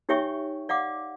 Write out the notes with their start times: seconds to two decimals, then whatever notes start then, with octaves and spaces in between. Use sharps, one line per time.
0.09 D#4 G4 C#5 E5 G5 C#6
0.69 D5 F5 F#5 D6